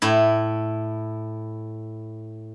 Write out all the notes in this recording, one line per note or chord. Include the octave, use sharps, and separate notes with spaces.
A2 E4